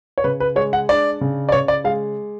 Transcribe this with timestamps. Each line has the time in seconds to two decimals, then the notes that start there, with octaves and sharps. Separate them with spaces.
0.18 C#5
0.24 C#3 B4
0.40 B4
0.56 G#3 C#5
0.73 F#5
0.89 D4 D5
1.21 C#3
1.49 D5
1.52 C#3 C#5
1.68 D5
1.84 G#3 F5